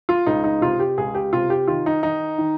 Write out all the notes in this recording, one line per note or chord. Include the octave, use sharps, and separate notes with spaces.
F4
C#2 D#4
D#4
C3 F4
G4
C#2 G#4
G4
C3 F4
G4
D#3 F4
D#4
D#3 D#4
D#3